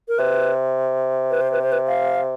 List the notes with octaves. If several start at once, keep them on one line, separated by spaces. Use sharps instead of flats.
A#4
C3 B4
B4
C5
B4
C5
B4
F5